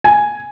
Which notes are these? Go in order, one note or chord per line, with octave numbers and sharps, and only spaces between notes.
G#5